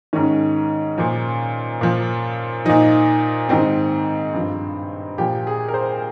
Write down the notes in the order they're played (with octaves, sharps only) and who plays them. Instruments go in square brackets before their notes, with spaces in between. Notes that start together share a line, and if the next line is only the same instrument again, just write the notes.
[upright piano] G#2 D#3 C#4
A#2 F3
A#2 F3
A#2 F3 D#4
G#2 D#3 C4
G2 F3
A#2 F3 G4
G#4
A#4
C5